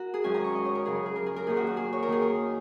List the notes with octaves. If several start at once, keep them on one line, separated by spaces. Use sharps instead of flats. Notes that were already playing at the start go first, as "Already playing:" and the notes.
Already playing: F#4 A#4
G#4
F#2 D#3 G#3 C#4 G#5
A#5
C#6
D#5
C#5
A#4
F#2 C#3 F#3 G#4
G#4
A#4
G#4
A#4
F#2 D#3 A#3 D#4 G#4
F#4
F#4
G#4
C#5
A#4
D#3 A#3 D#4 G#4
A#4